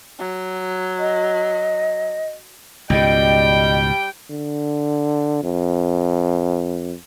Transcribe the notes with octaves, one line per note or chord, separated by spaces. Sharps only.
F#3
D#5
C#2 G#2 B2 G3 D#5 G5
D3
F2